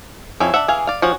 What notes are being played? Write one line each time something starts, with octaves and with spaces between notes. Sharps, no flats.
F2 C#4 E4 C5
D4 E5 F#5
E3 G#4 F5
D5 F5
F3 C#4 F#4 F#5